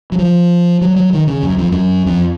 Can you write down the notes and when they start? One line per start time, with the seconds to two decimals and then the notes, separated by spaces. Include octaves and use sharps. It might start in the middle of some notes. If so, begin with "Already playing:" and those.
0.12 F#3
0.18 F3
0.81 F#3
0.96 F#3
1.13 D#3
1.27 C#3
1.43 F#2
1.58 F2
1.72 F#2
2.06 F2